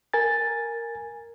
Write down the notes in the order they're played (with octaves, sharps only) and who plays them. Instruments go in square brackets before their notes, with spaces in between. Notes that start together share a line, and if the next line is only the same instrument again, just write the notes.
[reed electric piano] A#4 G#5 A6